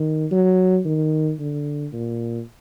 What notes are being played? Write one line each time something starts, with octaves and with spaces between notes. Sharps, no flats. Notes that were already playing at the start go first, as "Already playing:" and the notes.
Already playing: D#3
F#3
D#3
D3
A#2